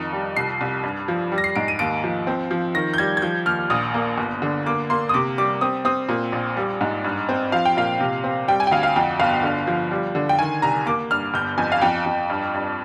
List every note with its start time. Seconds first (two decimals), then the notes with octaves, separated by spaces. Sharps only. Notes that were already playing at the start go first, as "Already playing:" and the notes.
Already playing: F2 D#3 D#4
0.13 G3
0.37 C2 C7
0.61 C2
0.83 G2
1.08 F3
1.32 G3
1.38 A#6
1.44 C7
1.56 G#2 D7
1.68 D#7
1.79 D#2 D7
2.04 F3
2.27 C4
2.51 F3
2.75 D#3 A#6
2.94 G6
2.98 G3 G#6
3.17 G#6
3.22 F3 G6
3.46 D#2 F6
3.70 A#1 D#6
3.94 A#3
4.18 G1
4.42 D3
4.66 A#3 D6
4.90 A#3 C6
5.09 D#6
5.14 C3 D6
5.38 G3 D6
5.61 C4 D#6
5.85 C4 D#6
6.09 A#2
6.32 A#1
6.57 G3
6.81 G#2
7.04 G2
7.29 C4
7.52 F3 F5
7.66 G5
7.77 A#2 F5
8.00 C3
8.24 C4
8.48 G3 G5
8.60 G#5
8.67 G5
8.71 D2 F5
8.83 F5
8.96 F2 G5
9.20 G1 F5
9.43 D3
9.67 F3
9.91 G3
10.15 D3
10.29 G5
10.39 D#3 G#5
10.62 C2 A#5
10.86 A#3 D6
11.11 G2 F6
11.34 G1 G6
11.58 F2 G#5
11.72 F5
11.82 F2 G5
12.06 F2
12.30 G2
12.54 G2